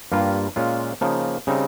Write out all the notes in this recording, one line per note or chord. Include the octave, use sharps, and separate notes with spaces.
G2 G3 A#3 F4
A#2 G#3 C#4 F4
C#3 F3 A#3 D#4
C#3 G3 C4 D#4